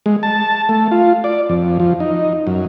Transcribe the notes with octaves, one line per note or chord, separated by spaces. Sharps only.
G#3
A5
A3
F4
D5
F2
F3
D#4
F#2